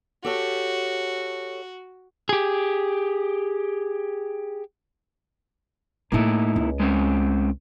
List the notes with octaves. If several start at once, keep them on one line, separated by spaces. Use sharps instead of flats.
F#4 G4 A4 C#5
G4 G#4
A2 A3 A#3 D#4 E4
C#2
G#3 C4 C#4